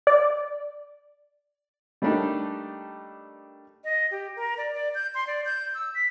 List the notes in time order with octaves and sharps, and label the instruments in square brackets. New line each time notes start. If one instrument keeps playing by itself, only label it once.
[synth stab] D5
[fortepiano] G3 A3 A#3 D4 D#4 G4
[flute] D#5
G4
A#4
D5
D5
G6
C6
D5
G6
E6
B6